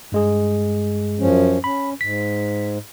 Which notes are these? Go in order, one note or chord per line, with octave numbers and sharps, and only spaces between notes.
G2 G#3 G#4
F#2 F3 C#4
C#4 B5
G#2 B6